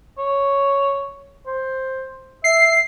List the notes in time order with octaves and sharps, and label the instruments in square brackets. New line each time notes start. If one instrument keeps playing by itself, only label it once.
[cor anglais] C#5
C5
[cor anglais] E5 [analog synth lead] C7